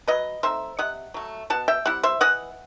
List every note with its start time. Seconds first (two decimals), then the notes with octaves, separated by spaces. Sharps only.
0.07 F#3 B4 D#5
0.43 A3 C4 D#4 C5 E5
0.79 C3 D#5 F#5
1.14 F#3 A3
1.50 B2 F#5 A5
1.68 E5 G5
1.85 G3 C4 E4 F#5
2.03 C5 E5
2.21 E3 D#5 F#5